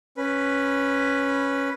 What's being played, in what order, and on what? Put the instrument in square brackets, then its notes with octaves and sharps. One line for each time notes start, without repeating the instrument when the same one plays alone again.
[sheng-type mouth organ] C#4 B4